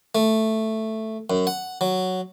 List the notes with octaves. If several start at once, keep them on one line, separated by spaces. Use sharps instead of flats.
A3
F#2
F#5
F#3